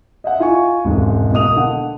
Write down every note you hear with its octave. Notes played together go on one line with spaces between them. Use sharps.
D#5 E5 F#5
D#4 F4 G#5 C#6
E1 C#2 G#2 C3
B2 A#3 D#5 D#6 F7
D3 F#5